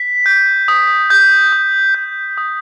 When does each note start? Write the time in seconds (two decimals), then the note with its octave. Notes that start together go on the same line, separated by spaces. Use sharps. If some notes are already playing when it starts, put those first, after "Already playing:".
Already playing: B6
0.26 G6
0.68 D#6
1.10 G6
1.52 D#6
1.95 G6
2.37 D#6